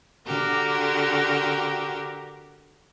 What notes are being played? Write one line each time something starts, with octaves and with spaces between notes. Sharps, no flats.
D3 F#4 G4 A#4